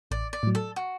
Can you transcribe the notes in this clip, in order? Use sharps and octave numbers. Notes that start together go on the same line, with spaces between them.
A1 D5
D5
A2 F#3
A4
F#4